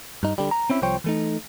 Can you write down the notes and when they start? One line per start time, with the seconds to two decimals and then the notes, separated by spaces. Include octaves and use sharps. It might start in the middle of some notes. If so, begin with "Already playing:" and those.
0.23 G2 D#4
0.38 D3 G3
0.51 A#5
0.70 C4 C#4 E4
0.82 C2 F3 C5 C#5 G5
1.04 E3 A3 D#4